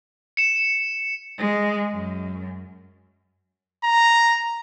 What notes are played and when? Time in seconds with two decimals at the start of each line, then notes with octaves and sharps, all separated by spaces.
0.37 C#7 E7
1.39 G#3
1.93 F#2
3.84 A#5